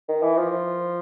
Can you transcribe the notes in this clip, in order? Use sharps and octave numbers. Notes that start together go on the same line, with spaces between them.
D#3
E3
F3